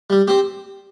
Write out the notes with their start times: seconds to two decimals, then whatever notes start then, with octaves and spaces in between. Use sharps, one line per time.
0.10 G3
0.28 C4 G4